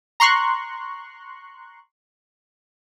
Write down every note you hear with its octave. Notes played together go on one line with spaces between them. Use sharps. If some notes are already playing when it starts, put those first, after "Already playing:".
A#5 C6 C#6 F#6